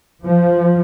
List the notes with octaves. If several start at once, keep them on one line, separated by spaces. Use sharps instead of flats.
F3